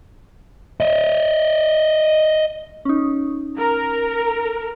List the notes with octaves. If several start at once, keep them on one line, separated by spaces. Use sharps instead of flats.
D#5 E5
C#4 D#4
A#4